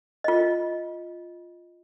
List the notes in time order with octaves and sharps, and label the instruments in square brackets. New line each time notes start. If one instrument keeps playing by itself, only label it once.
[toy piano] F4 D#5